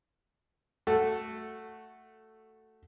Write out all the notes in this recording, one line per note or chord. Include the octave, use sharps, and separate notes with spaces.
A3 F#4 A4